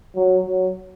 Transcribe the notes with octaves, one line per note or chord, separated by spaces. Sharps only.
F#3
F#3